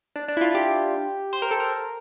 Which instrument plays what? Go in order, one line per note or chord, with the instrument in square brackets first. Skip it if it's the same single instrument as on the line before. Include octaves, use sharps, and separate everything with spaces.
[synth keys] D4
D4
E4
F4
G4
C5
A#4
A4
A#4